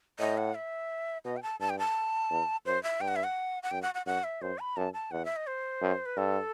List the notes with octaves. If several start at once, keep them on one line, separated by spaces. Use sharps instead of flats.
A2 D#5
F#5
E5
B2 D#5
G5
A5
G2 A5
G5
A5
E2
F#2 C5
E5
G2 G5
F#5
E5
F#5
F#5
F#2 G5
F#5
F#5
F#2 F#5
E5
F#2 C5
B5
F#2 A5
A5
E2 F#5
E5
D#5
C5
F#2
B4
G2 A4